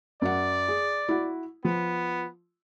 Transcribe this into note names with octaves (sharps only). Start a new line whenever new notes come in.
F#2 D5 F#5
G#4
E4 F#4
F3 B3